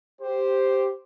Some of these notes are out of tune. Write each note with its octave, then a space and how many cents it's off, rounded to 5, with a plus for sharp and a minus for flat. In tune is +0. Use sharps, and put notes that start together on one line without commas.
G4 +0 C5 +0